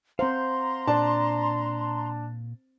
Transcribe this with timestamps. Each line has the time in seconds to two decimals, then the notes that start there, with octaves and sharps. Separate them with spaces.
0.19 C4 C5 F5 F#5 A#5 C6
0.87 A#2 D4 A5